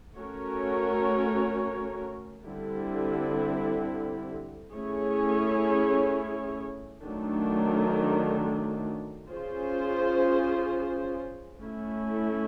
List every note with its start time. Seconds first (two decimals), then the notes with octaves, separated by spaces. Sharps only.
0.17 A3 C#4 F#4 A#4 C#5
2.46 D3 G3 C4 E4
4.75 A3 C#4 E4 G#4 C#5
7.03 D#3 F#3 A3 D4
9.32 C#4 F4 G#4 C5
11.60 A3 C#4 E4